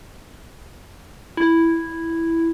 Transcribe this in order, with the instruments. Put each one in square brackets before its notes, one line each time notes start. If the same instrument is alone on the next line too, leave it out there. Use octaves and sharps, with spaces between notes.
[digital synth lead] E4